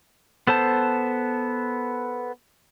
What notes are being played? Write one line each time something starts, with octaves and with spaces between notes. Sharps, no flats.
B3 A4 C5 A5